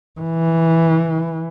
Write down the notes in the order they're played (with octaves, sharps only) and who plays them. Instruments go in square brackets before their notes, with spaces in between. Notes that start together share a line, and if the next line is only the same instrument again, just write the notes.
[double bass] E3